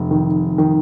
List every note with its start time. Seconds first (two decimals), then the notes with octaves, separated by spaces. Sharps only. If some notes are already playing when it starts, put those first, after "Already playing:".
Already playing: F1
0.11 D#3
0.58 D#3